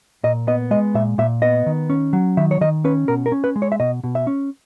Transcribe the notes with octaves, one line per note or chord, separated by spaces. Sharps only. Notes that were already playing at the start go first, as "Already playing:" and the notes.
A#2 D#5
B3 D#5
G#3 D#5
A#2 E5
A#2 E5
B3 D#5
D#3
C#4
F#3
D#3 E5
C#5
D#3 D#5
C#4 B4
B2 A#4
A#4
C#4
B4
G#3
C#5
E5
B2 D#5
B2
E5
C#4